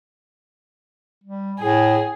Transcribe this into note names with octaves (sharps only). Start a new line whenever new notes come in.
G3
A2 G#4